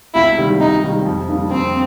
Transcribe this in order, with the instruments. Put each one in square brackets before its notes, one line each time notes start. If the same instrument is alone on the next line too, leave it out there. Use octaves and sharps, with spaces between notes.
[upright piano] C#2 [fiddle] E4
[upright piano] C3 D#3 G3
[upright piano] C#2 [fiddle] D#4
[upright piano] C3 D#3 G3
F2
D3 G3 A#3 D#4
[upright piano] F2 [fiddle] C4